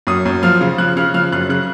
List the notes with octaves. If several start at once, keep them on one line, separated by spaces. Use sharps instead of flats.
F#2 D#6
F#2
F3 F6
C#3
F3 F#6
C#3 F6
F3 F6
F#2 F#6
C#3 F#6